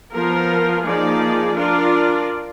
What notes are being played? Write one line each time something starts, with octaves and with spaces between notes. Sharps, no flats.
F3 B3 F4 A#4
F3 A#3 D#4 G#4 D5
D4 F4 A#4 D5